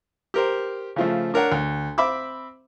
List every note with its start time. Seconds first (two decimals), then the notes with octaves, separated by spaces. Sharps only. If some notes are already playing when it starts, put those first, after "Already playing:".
0.34 G4 A#4 C5
0.96 C#3 F3 A3
1.34 D4 A#4 C#5 F#5
1.52 D2
1.98 C4 E5 B5 D6 E6